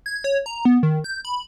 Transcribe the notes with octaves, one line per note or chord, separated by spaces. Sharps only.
G#6
C#5
A#5
B3
D#3
G6
B5